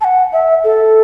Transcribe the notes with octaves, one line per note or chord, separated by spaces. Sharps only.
A5
F#5
E5
A4